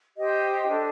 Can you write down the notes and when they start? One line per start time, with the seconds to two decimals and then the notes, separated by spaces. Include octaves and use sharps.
0.16 G4 C5 D#5 G5
0.67 D4 A4 D#5